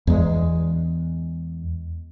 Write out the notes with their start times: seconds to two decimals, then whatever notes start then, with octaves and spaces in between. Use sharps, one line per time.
0.07 E2 G#3